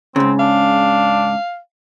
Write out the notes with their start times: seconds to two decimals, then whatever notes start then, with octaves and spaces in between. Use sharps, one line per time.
0.16 G#2 C#3 C4
0.40 D4 F5